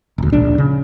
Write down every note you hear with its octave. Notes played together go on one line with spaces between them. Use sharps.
E1 D2
D1 A#1 D4
C#3